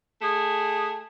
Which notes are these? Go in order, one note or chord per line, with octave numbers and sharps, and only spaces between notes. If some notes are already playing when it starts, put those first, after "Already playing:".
A3 G#4